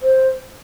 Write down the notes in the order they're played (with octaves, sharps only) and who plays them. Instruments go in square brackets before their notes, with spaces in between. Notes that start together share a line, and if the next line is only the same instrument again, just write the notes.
[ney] C5